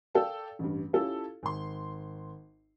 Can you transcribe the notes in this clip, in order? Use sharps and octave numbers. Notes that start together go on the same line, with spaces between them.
A4 D5 F5 G5 A5
A1 G2
C#4 E4 F4 G4 A4 F5
G#1 C6